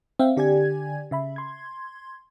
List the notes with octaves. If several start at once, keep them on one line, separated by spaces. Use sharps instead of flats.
C4 E5 F5 G5
D3 G4 D5 G#5 G#6
C#3 E5 B5
C6 G#6